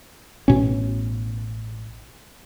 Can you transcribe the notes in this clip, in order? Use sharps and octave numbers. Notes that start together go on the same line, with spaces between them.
A1 B2 C#4